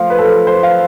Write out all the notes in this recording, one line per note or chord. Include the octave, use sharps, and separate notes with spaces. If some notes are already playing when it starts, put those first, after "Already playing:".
Already playing: F3 A3 F5
B4
A4
C5
F5